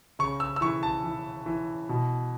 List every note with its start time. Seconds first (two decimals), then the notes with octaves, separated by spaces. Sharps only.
0.19 C#3 C#6
0.40 E6
0.56 E6
0.61 E3 C#6
0.83 A5
1.04 E3
1.46 E3
1.89 B2